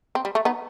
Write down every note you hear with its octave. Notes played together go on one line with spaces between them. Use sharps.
C4
G3
A3
B3 D#4